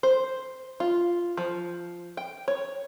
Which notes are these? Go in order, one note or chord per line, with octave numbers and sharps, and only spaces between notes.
C5
F4
F3
G5
C#5